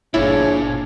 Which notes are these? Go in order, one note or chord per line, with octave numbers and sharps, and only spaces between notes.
G1 A#2 F3 D4 E4 G#4 C#5